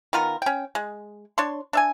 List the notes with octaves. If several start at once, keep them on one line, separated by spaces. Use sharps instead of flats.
D#3 B3 F4 A#4
C#4 G5
G#3
D4 C#5 C6
D4 E5 G#5